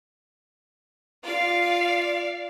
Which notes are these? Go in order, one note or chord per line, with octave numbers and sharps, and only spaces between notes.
F4 D5 F5